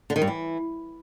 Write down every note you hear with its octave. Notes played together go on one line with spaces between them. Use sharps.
D3
D#3
G2
E3